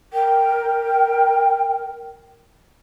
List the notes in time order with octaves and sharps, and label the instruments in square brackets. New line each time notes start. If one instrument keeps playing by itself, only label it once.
[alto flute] A#4 [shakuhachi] G5